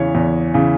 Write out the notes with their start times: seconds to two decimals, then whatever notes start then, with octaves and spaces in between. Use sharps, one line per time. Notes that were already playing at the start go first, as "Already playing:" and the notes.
Already playing: E2 C#3 E3 C#5
0.15 E2
0.54 C#3 E3